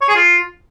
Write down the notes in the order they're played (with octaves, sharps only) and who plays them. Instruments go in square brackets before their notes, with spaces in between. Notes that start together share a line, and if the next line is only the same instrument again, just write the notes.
[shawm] C#5
G#4
F4